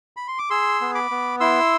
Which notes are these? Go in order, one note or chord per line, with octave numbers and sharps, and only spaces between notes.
B5
C6
D6
G#4 C6 E6
B3
B5 D6
B3
E4 C6 E6